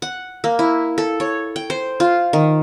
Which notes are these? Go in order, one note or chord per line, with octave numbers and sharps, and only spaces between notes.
F#5
A#3
E4
A4
C#5
G5
C5
F4
D#3